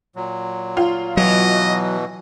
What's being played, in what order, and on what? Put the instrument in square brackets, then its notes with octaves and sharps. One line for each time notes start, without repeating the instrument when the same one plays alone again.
[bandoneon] A#2 F#3
[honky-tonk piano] F4
[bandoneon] B2 E3 [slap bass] F#3 [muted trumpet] D#5